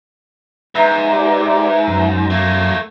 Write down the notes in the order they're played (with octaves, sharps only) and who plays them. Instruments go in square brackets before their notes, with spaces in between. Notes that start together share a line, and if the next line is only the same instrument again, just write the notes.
[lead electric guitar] G#2 [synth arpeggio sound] B4 E5 A#5
[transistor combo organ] G4 D5
F#2
[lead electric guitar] A3 A#3